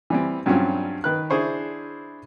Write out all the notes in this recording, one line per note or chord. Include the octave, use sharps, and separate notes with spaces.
E3 G3 C4
G2 F#3 G3 C4 C#4 F4
D#3 B4 F#6
D4 E4 G#4 C5 C#6